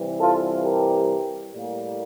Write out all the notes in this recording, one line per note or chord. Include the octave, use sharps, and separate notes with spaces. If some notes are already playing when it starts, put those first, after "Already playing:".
Already playing: C3 E3 G3
F4 A4
G4 A#4
A2 G3 A#3